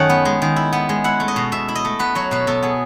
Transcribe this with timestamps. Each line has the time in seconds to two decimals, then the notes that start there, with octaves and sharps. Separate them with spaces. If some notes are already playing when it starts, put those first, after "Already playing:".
Already playing: F#2 D#3 A3 C#4 C#5 F#5
0.09 B3
0.25 G#3
0.42 D#3
0.56 E4
0.73 B3
0.89 G#3
1.04 E4 F#5
1.20 A3
1.28 D#5
1.36 B2
1.52 B2 E5
1.68 E4
1.75 D#5
1.85 A3
1.99 B3 B4
2.15 F#3 C#5
2.31 B2 B4
2.47 B2 A4
2.63 B3 G#4